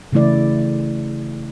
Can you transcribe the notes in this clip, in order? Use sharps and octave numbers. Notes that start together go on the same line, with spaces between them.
C#3 E3 A3 E4 D5